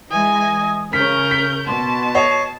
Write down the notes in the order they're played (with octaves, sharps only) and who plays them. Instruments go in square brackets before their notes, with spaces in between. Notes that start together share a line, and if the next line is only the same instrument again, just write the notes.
[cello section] E3 G#3 D#5 [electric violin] G#5 [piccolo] D#6
[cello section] C#3 C#4 [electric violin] A#4 G6 [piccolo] F6 [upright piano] B6
[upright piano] B6
[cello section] B2 [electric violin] A5 [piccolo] C6
[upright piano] C#5 D#5 [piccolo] C7